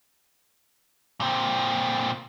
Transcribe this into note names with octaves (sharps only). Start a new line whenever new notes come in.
A#2 C4